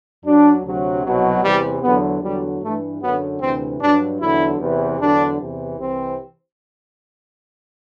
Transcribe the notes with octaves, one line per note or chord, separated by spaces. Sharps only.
F#2 F#3 D4
D2 C3 F#3
C2 B2 F#3
E2 C3 E3 G3
E2 D3 F#3 B3
E2 D3 F#3 G3
G2 E3 A3
F#2 D3 F#3 B3
D2 C3 E3 C4
G2 F#3 D4
E2 D3 F#3 E4
E2 C3 E3
E2 D3 F#3 D4
E2 C3 E3
C2 C3 E3 C4